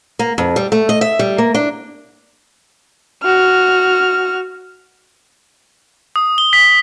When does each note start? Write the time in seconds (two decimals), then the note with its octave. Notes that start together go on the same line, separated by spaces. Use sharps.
0.19 A#3
0.38 F2
0.56 G3
0.72 A3
0.89 D#5
1.01 E5
1.19 G3
1.38 A#3
1.55 D4
3.23 F#4 F6
6.16 D#6
6.38 G7
6.53 B6